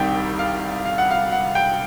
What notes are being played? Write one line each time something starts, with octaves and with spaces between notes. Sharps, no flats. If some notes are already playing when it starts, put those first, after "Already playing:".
Already playing: C2 C3 D#3 G3 G5
F5
F5
F#5
F5
F#5
G5